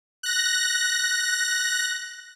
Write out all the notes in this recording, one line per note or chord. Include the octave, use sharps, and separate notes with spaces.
F#6 A#6